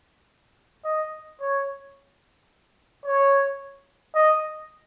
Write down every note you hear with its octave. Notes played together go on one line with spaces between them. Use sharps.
D#5
C#5
C#5
D#5